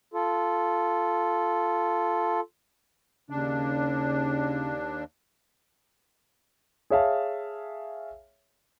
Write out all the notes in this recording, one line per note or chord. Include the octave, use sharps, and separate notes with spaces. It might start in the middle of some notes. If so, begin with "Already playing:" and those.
F4 A4
D#2 C#3 D4
G#4 C#5 E5 F5 A5